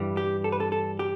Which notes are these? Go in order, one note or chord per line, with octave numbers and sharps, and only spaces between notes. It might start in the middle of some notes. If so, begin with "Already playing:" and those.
Already playing: G2 E3 G3
G4
A4
B4
A4
A4
G4